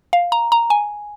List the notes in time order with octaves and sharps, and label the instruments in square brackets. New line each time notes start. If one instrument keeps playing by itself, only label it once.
[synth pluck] F5
A#5
A#5
G#5